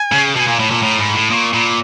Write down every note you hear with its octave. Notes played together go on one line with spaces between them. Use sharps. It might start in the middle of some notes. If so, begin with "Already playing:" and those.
Already playing: G#5
C#3
B2 G#5 A5
A#2
A2 A5
A#2
A2 A#5
G#2 B5
A2
A#2 C#6 D#6
A#2 B5